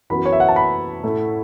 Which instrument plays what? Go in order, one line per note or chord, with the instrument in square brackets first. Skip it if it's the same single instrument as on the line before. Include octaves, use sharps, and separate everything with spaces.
[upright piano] F#2 E3 B3 F#4 [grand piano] B5
[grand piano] C#5
E5
F#5
A5
B5
[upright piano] A2 A3 E4